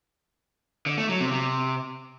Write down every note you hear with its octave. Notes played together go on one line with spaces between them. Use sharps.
D3
A3
F#3
C3
C3